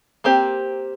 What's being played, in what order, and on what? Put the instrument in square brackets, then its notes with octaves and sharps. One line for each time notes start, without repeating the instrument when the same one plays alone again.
[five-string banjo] A#3 C4 G4